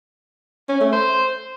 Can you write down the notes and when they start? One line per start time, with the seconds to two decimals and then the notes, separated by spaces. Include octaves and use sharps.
0.68 C#4
0.80 A3
0.92 C5